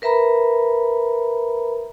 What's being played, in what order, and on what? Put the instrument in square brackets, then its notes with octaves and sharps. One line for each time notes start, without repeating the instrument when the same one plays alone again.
[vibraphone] A#4 B4 E5 A#5 B5